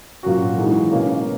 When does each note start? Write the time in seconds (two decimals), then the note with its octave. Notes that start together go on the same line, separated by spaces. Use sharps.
0.23 A#2 F#3 C#4 F#4
0.57 E3 G#3 D#4
0.91 B2 A#3 C#4